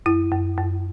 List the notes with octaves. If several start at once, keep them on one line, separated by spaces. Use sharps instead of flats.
F#2 E4
F#2
F#2